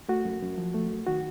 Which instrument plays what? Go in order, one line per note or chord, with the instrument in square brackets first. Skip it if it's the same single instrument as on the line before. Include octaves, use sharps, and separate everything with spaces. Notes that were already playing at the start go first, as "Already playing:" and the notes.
[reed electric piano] A3 F#4
F#2
F#2
F3
A3
F#2
D#3 F#4